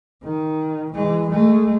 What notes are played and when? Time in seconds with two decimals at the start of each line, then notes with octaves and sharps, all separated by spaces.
0.23 D#3
0.94 E3 G#3
1.31 G#3 A3